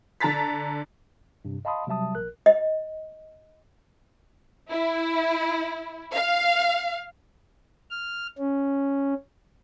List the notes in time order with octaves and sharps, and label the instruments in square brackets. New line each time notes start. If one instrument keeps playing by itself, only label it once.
[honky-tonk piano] D3 A5 A#5 A6 B6
[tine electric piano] G2 C3
D#5 F5 A5 B5 C6 D#6
C3 F#3 G3 E5 A5 D#6
A#1 A#4 F#6
[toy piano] D#5
[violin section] E4
F5
[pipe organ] F6
C#4